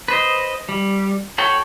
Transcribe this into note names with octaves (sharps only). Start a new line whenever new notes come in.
B4 C5 D#5
G3
F#4 A4 C#5 G5